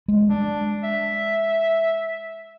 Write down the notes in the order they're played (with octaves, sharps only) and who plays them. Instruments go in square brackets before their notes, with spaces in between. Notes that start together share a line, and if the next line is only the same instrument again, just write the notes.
[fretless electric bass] G#3
[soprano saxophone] D4
E5